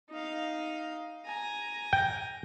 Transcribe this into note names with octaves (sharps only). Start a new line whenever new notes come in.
D#4 F5
G#5 A#5
G5